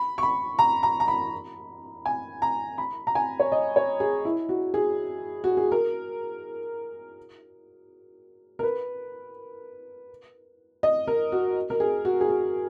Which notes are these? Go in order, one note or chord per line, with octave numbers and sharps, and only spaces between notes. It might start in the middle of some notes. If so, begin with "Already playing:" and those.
Already playing: B5
C#6
B5
A#5
A#5
A#5
B5
G#5
A#5
B5
A#5
G#5
C#5
D#5
C#5
G#4
E4
F#4
G#4
F#4
G#4
A#4
A#4
B4
D#5
A#4
F#4
A#4
G#4
F#4
G#4
F#4